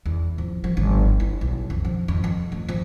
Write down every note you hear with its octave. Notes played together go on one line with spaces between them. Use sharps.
E2
F3
F3
G1
E4
B1
F2
F3
F2
F2
A3
F3